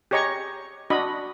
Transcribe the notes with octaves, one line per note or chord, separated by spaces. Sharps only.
G4 G#4 C#5 D#5 A#5 C#6
D4 F#4 D#5 B5